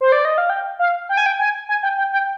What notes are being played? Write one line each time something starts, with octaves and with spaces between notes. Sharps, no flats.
C5
D5
D#5
F5
G5
F5
G5
G#5
G5
G#5
G#5
G5
G5
G5